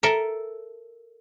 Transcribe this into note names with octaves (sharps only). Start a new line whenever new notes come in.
A4 A#4 E5 A#5